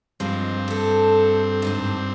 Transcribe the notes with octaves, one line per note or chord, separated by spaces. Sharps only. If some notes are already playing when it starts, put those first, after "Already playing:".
G2 F3 G#3 C4
A3 A4
D2 G#2 D4